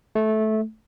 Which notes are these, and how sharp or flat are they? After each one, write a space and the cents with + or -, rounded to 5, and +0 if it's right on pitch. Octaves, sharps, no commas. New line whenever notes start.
A3 -15